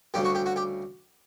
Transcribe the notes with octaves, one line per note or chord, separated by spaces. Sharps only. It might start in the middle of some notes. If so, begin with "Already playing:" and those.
D2 C#3 G3 G4
F#4
G4
F#4
G4